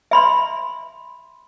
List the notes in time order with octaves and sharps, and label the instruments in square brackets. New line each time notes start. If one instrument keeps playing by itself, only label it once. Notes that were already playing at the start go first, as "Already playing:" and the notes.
[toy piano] E5 B5 C6